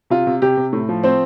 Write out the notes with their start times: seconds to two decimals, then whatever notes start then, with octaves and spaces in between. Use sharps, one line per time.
0.10 C3 F4
0.27 C3
0.42 C3 G4
0.57 C3
0.73 A2
0.89 F3
1.03 C4 C5